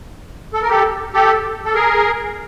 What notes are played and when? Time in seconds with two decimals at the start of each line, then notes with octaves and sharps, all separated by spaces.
0.54 A4
0.62 A#4
0.69 G4 A4
1.14 G4 A4
1.65 A4
1.74 G#4 A#4